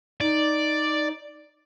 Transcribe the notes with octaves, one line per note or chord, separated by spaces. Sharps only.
D#4 D5